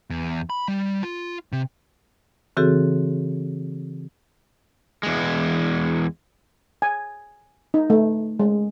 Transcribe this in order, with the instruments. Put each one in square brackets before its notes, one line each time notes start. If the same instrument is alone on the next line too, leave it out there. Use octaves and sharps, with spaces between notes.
[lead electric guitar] E2
B5
G3
F4
C3
[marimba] C#3 E3 C4 F#4 G#4 A4
[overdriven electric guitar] E2 G#3
[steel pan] G#5
D#4
A3
G#3